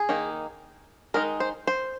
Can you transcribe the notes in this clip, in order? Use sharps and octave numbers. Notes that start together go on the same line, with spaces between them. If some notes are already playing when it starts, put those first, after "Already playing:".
Already playing: G#4
D#3 A#3 D#4
D#3 G#3 D#4 A#4
C5
C5